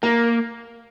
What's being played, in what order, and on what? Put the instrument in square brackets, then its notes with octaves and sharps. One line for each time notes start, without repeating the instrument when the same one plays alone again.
[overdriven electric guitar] A#3 [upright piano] A#4